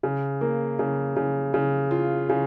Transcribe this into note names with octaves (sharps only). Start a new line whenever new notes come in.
C#3
A#3
C#3
C#3
C#3
F4
C#3